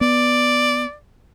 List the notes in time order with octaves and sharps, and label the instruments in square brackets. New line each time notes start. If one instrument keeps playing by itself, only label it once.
[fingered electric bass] B3 [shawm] D5